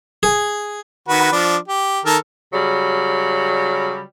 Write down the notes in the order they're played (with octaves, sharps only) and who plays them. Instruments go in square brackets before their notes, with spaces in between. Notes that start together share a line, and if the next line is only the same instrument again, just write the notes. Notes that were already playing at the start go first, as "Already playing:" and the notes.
[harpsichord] G#4
[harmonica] D#3 F#4 B4
F3 D4
G4
D#3 A4 A#4
[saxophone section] C#3 F#3 G3